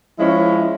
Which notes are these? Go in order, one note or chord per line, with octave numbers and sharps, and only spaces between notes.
F3 G#3 C#4 E4